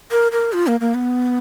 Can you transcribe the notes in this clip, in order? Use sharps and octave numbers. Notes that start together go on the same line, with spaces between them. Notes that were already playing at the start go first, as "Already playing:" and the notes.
A#4
A#4
F4
A#3
A#3
B3